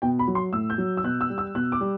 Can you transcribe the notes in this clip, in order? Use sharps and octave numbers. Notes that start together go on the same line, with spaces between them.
B2 G5
B5
F#3
C6
A2 E6
G6
F#3
E6
B2 F#6
E6
G3
E6
B2 F#6
D6
G3